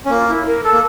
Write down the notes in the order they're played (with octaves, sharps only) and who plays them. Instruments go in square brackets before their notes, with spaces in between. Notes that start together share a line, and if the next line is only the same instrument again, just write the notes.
[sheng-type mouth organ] C#4
[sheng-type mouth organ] A#3 [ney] F4
[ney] E4
A#4
A4
[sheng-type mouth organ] A#3